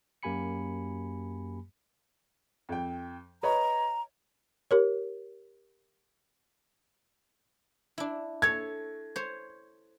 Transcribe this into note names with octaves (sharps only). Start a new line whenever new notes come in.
F#2 A#3 G4 G#5 B5 C#7
F2 G5
B4 C#5 D#5 A#5
G4 A#4 C#5
D4 E4
A4 C#5 G#6
C5 C#5